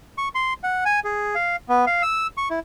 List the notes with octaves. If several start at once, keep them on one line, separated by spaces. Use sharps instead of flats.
C#6
C6
F#5
G#5
G#4
F5
B3
F5
E6
C#6
E4